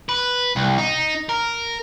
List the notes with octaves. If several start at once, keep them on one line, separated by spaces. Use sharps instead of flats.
B4
C2
D#4
A#4